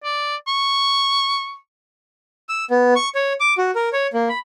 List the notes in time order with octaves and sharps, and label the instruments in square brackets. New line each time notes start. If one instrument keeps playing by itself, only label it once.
[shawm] D5
C#6
[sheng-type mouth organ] E6
B3
C#6
C#5
D6
F#4
A#4
C#5
A#3
B5